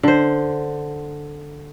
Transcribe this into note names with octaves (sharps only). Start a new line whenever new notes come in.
D3 C5